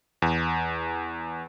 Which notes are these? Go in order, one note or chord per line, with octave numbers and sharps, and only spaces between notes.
E2